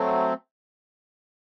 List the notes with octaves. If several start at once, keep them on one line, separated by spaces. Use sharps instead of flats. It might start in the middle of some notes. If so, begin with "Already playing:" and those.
Already playing: F#3 A3 C4